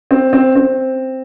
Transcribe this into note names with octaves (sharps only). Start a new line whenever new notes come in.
C4
C4
C4